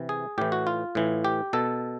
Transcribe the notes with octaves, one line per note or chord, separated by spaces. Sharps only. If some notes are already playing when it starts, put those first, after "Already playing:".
Already playing: C3 E3
G#4
A2 E3 G4
F#4
F4
A2 E3
G4
B2 A4